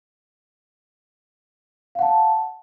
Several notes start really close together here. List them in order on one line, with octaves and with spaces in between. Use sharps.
F5 F#5 A5